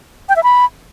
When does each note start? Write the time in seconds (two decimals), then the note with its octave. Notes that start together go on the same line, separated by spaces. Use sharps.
0.29 G5
0.36 E5
0.43 B5